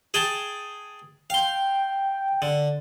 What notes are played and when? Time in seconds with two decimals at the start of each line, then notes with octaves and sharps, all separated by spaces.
0.14 G#4 G5 A5
1.30 F5 G5 C6
2.42 D3